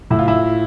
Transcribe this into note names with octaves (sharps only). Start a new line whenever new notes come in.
A2 E4
F4
E4